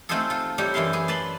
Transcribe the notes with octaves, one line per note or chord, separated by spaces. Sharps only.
A3 C4 D#4 F4 G#4 A4
F4 A4
G3 D#4 E4 G4 C#5
F#2 E3 E4 E5 F5 C6
G#4 G#5
B4 D5 A5 B5 C6